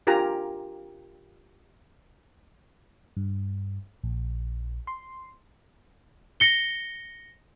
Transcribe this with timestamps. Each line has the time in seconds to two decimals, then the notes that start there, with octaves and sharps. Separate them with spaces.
0.07 D4 F4 G4 A#4 G#5 A#5
3.17 G2
4.03 A#1
4.87 C6
6.40 A#6 C#7 G7